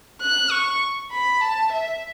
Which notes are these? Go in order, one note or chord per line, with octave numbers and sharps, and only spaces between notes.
F#6
C#6
B5
A5
E5